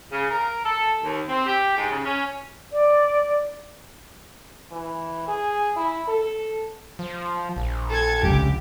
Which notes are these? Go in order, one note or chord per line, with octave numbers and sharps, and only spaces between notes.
C#3
A#4
A4
D#2
C4
G4
G#2
C#3
C#4
D5
E3
G#4
E4
A4
F3
A#1
A4 G#6
F1 C#2 D3 G4